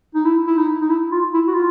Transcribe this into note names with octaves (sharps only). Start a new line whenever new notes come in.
D#4
E4
E4
D#4
D#4
E4
F4
E4
F#4
F4